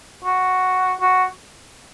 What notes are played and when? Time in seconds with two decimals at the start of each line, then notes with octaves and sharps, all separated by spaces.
0.24 F#4
1.01 F#4